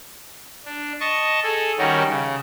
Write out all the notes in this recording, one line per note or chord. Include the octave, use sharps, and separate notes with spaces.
D4
D#5 A5 C#6
G#4 A4
D#3 G3 C#4 F#4 A#4 C#5
C#3